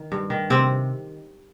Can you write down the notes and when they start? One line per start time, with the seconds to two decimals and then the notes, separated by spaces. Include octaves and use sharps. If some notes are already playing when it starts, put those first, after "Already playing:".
Already playing: D#3
0.12 G2
0.30 D#3
0.50 C3 C4